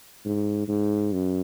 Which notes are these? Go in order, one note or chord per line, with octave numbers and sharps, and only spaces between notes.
G#2
G#2
F#2